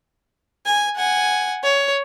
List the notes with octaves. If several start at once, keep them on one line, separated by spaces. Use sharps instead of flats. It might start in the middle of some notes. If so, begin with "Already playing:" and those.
G#5
F#5 G#5
C#5